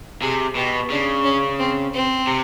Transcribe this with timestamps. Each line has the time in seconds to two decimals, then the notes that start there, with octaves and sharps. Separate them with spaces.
0.21 C3 G#4
0.55 B2 G4
0.90 C#3 D4
1.24 C#4
1.59 C4
1.94 C4
2.27 C3